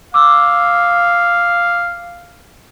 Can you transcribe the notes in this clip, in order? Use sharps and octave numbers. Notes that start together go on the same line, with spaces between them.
F5 D6 E6